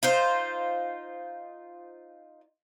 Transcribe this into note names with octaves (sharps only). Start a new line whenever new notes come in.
D#4 F4 C5